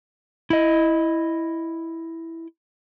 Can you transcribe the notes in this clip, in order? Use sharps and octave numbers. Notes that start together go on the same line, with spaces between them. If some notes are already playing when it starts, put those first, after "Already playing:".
E4 D#5